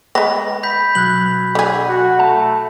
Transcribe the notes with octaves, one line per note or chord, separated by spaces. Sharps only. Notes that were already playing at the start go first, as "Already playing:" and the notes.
G#3 B3 A#6
B5 G6 B6
B1 F#3 F#7
D3 G#4
F#4
A3 A5